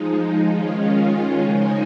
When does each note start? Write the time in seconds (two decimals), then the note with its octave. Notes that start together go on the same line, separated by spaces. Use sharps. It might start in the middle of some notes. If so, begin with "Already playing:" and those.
Already playing: F3 G#3 D#4
0.54 D#3 G#3 C#4 F4
1.41 C#3 F3 G#3 D#4 G#4